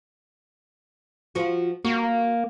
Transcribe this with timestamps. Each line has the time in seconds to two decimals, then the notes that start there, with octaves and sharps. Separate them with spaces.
1.35 F3 F#4
1.85 A#3 F#4